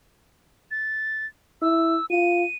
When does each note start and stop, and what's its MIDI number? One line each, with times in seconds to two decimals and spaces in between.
0.71 1.26 93
1.62 1.97 64
1.62 2.06 88
2.10 2.44 65
2.10 2.57 99